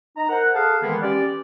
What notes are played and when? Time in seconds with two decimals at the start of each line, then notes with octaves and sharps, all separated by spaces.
0.17 D#4 D#5 A#5
0.30 A#4 C5 F#5
0.55 G#4 A4 F5 F#5 A5
0.83 D#3 E3 G#3 A#3 B3
1.03 C#4 G4 D5